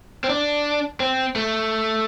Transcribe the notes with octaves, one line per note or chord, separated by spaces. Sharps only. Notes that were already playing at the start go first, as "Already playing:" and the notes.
C4
D4
C4
A3